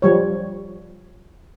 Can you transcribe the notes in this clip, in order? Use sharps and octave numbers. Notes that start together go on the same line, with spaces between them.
F3 G3 C#5